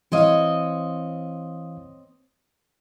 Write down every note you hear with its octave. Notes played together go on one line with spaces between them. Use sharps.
E3 C4 C#5 D#5 F5